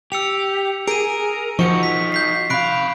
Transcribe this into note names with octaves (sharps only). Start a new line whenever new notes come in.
G4 E6 C#7 F7
G#4 A#4 D7 D#7
F3 D#4 F#4 C#6 C#7
B6
G6 B6 C7
C3 F5 B5 F#6 D7